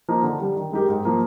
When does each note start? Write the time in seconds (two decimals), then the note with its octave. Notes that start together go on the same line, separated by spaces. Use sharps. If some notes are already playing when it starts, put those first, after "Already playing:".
0.09 F3 A#3 D#4
0.23 D3
0.39 G3 D4
0.56 D#3
0.72 G#3 D#4 G4 A#4
0.89 G#2
1.05 F3 A#3